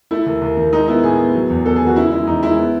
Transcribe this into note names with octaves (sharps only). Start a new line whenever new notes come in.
A3 E4
D#2
D#2
D#3
G#3 D#4
B3 E4
A2 G#4
B3
F#3
E2
B3 A4
D#3 G#4
F#4
C#3 E4
G#3 E4
E2 D#4
G#3 E4
B3